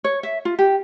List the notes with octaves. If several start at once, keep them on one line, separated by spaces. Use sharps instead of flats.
C#5
E5
F4
G4